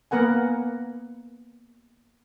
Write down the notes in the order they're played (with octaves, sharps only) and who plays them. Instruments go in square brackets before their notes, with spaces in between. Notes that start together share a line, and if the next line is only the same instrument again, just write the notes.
[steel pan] A#3 B3 A#4 F#5 G#5